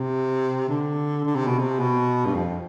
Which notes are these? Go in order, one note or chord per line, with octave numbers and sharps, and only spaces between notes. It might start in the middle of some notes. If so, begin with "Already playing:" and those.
Already playing: C3
D3
D3
C3
B2
C3
B2
G2
F2